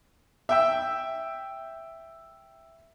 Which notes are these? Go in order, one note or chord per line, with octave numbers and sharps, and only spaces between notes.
E5 G5 E6